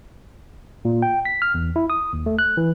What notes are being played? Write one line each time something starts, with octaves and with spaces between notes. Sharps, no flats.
A#2
G5
B6
F6
E2
E4
D#6
D#2
A3
F#6
E3